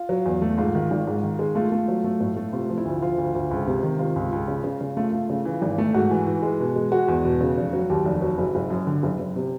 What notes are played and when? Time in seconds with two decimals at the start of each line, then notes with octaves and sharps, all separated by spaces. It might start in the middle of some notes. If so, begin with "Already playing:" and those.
Already playing: F4
0.09 F#3
0.25 E2
0.42 A3
0.58 G#2 F4
0.75 D#3
0.91 G#1
1.07 G#2
1.23 D#3
1.39 G#3
1.55 A3 F4
1.72 A3
1.88 F#3
2.04 A3
2.20 A2
2.36 A3
2.53 C3 F4
2.69 F3
2.78 E4
2.85 D2
3.02 F3 F4
3.18 D2
3.34 D2
3.51 C#2
3.67 C3
3.83 D#3
3.99 C3 F4
4.16 C#2
4.32 C#2
4.48 C#3
4.64 C#3
4.81 C#3
4.97 A3 F4
5.13 A3
5.30 C#3
5.45 E3
5.62 G#1
5.78 A3
5.94 G#2 F#4
6.11 E3
6.27 E3
6.42 G#3
6.60 B2
6.76 G#3
6.92 G#3 F#4
7.08 E2
7.25 B2
7.41 C#3
7.57 F1
7.73 F#3
7.90 D#2 G4
8.05 F1
8.22 F#3
8.38 F#1
8.55 F#1
8.70 F#2
8.87 D3
9.03 F#1
9.19 F#1
9.36 C3